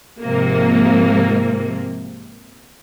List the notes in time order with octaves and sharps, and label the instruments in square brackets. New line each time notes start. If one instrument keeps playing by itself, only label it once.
[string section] G#2 C3 F3 A#3